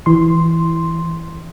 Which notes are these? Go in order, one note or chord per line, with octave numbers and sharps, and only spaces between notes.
E3 C6